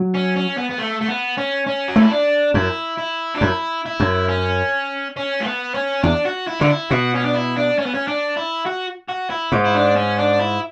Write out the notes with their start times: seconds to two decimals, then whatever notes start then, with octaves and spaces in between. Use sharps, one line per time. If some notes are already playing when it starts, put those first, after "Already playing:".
Already playing: F#3
0.15 C#4
0.37 C#4
0.58 B3
0.71 B3
0.79 A3
1.01 A3
1.08 B3
1.37 C#4
1.67 C#4
1.88 F#4
1.96 A3
2.00 E4
2.10 D4
2.54 F#2 E4
2.97 E4
3.35 D4
3.41 F#2 E4
3.86 E4
4.00 F#2
4.29 C#4
5.17 C#4
5.40 A3
5.46 B3
5.74 C#4
6.03 E2 D4
6.25 F#4
6.47 E4
6.60 D3 D4
6.69 E4
6.91 B2 F#4
7.14 C#4
7.24 D4
7.34 E4
7.57 D4
7.78 C#4
7.86 B3
7.94 C#4
8.07 D4
8.36 E4
8.66 F#4
9.09 F#4
9.30 E4
9.52 G#2
9.64 E4
9.74 D4
9.96 C#4
10.18 D4
10.39 E4